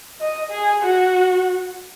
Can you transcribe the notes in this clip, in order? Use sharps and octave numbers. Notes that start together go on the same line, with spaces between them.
D#5
G#4
F#4